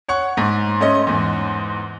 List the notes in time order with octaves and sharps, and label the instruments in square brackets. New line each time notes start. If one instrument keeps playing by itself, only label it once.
[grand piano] C#5 F#5 C#6
[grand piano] G#2 [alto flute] C6
[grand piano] A3 C#4 D#5
E2 G#2